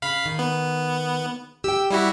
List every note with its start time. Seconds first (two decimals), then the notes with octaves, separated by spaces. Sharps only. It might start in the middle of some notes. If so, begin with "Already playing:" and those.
0.02 C#3 F5 B5
0.26 D#3
0.39 B3
1.64 G4 G5 E6
1.91 G3 E4 F#4